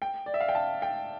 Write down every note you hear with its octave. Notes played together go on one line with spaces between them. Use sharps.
G5
D5
E5
F5
G5
A5
G5